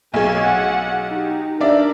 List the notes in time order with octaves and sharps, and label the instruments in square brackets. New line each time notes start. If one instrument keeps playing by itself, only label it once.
[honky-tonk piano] B1 G#4 [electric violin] C#5 G#5
[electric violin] F#5
D#4 G4
[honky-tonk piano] D4 D5 E5 [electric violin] A#4